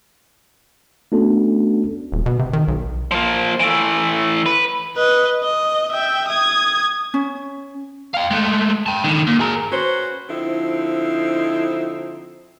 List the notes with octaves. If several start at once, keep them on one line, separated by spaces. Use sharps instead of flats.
A3 B3 C#4 D4 F#4 A4
D#1
B2
C3
D#3
B1
F3 A#3
E3 A3
B4
B4 D#5
D#5
E5 G5
D#6 G#6
C#4
F5 G5
G#3 A3
G5 A5
D3 D#3
A#2
G#4 A#4
C#4 F#4 B4 C5
D3 F3 C4 D#4 E4